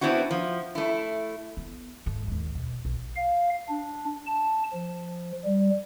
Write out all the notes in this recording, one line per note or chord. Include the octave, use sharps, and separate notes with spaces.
B3 C4 D4 E4 F#4
F3
A3 E4
B3
G#2 A3
D#2 G#3
E1
B1
F5
D4
A5
F3
G3